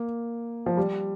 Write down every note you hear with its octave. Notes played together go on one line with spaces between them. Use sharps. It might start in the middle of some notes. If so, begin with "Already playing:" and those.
Already playing: A#3
F3
G3